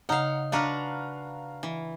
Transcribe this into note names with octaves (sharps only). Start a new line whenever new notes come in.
C#3 D#4 F5 F#5 A#5
D4 F#4 B4 F5 A#5 F6
E3